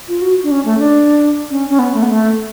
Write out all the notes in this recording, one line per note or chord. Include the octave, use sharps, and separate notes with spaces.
F4
F#4
D4
C#4
A3
D4
C#4
C#4
B3
A3
B3
A3